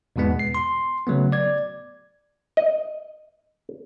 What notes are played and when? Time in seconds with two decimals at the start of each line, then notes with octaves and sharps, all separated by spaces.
0.16 E2 G#2 B2 G#3 B3
0.39 C7
0.55 C6
1.07 C#3 F#3 A3 B3
1.32 D5 G#6
2.57 D#5